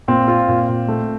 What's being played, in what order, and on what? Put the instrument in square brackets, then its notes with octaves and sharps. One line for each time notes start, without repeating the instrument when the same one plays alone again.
[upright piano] A#2 [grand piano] C4
[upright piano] F4
A#2
A#2
A3